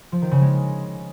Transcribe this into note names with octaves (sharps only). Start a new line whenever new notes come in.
F3
D#3
C#3
G#3